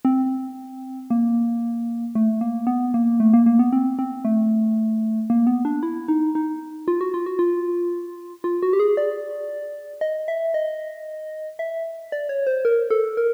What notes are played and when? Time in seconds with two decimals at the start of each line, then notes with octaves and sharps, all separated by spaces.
0.05 C4
1.10 A#3
2.15 A3
2.41 A#3
2.67 B3
2.94 A#3
3.20 A3
3.33 A#3
3.46 A#3
3.59 B3
3.73 C4
3.99 C4
4.25 A3
5.30 A#3
5.47 B3
5.65 D4
5.83 E4
6.08 D#4
6.35 D#4
6.88 F4
7.01 F#4
7.14 F4
7.26 F#4
7.39 F4
8.44 F4
8.63 F#4
8.73 G4
8.79 G#4
8.97 D5
10.01 D#5
10.28 E5
10.54 D#5
11.59 E5
12.12 D5
12.29 C#5
12.47 C5
12.65 A#4
12.90 A4
13.17 A#4